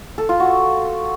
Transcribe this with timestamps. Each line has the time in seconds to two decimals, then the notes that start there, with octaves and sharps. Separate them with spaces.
0.18 A4
0.29 F4
0.40 F#4